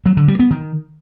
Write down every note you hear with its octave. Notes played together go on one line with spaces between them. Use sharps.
F#3
D3
G3
B3
D#3